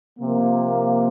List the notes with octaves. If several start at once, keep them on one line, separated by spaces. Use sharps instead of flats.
C3 F3 A#3